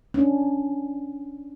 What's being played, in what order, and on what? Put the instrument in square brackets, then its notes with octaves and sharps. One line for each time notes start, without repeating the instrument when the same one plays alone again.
[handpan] C#4 D4